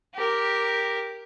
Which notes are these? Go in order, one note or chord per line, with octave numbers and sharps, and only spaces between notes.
G4 A#4